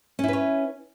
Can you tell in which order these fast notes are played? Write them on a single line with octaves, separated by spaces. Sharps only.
C#4 E4 B4 C#5